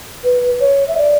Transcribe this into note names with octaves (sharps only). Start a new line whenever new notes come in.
B4
C#5
E5
D5